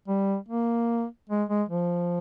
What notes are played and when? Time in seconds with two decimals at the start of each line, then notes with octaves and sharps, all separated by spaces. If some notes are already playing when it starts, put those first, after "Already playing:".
0.08 G3
0.48 A#3
1.30 G#3
1.49 G#3
1.69 F3